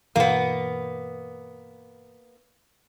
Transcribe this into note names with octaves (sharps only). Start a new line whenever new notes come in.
G2 B2 E3 A#3 B3